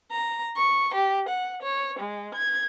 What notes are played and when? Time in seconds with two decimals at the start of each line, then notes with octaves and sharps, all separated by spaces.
0.12 A#5
0.56 C#6
0.95 G4
1.27 F#5
1.62 C#5
1.99 G#3
2.33 G#6